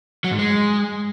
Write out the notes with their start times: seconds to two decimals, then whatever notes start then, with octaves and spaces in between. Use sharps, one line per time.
0.24 F#3
0.32 G#2
0.39 G#3